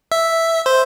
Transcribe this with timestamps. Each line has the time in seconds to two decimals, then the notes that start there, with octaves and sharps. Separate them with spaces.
0.12 E5
0.66 C5